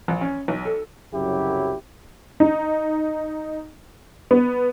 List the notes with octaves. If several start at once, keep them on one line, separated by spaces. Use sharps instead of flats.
A#1
C#4
B1
A4
C2 F#2 C#3 F#3 E4 G4
D#4
B3